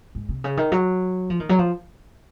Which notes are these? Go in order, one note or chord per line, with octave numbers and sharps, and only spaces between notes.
G#2
C3
C#3
D#3
F#3
F3
D#3
F#3
F3